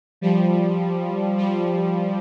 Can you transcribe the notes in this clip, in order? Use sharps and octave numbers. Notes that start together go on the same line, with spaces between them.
F3 G3
F3 G3